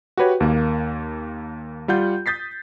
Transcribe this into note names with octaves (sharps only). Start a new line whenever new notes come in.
F#4 G4 B4 C#5
D#2 A#3
G3 F4 F#5 G6
D#6 G6 A6 B6 C7